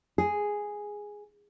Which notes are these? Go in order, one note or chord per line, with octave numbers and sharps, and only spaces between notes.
G#4